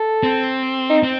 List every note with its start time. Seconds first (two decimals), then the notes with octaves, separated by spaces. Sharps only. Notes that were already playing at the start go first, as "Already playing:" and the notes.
Already playing: A4
0.23 C4
0.90 D#4
1.03 C4